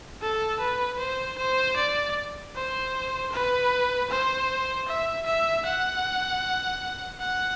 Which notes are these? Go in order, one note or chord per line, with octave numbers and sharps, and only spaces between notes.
A4
B4
C5
C5
D5
C5
B4
C5
E5
E5
F#5
F#5